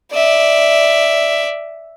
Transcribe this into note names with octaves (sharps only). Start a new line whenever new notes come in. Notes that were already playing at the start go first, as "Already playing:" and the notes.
D5 E5